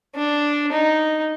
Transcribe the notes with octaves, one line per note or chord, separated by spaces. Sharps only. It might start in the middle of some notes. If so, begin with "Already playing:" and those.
D4
D#4